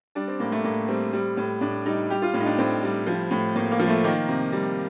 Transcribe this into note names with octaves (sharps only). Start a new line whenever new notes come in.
G3 D4
C4
A2 A#3
A3
A2 A#3
G3 C4
G3
A2
A2 D4
G3 D#4
G3 G4
F4
A2
D#4
D4
A2 C4
G3
F3
A2
A2 A#3
A#3
F3
A3
D#3 A#3
C3
G3